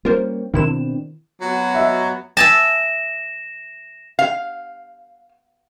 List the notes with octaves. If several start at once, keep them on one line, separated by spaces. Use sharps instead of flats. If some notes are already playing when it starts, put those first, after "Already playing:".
G3 A#3 C#4 F4 A#4 C5
B2 D#3 C4 D4 E4 E7
F#3 B3 F#4
D#5 E5
E5 G#5 A5 A#6 E7
F5